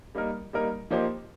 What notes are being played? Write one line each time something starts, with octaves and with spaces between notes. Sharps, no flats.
G3 A#3 D#4 A#4
G3 A#3 D#4 A#4
F3 A#3 D#4 G4 C5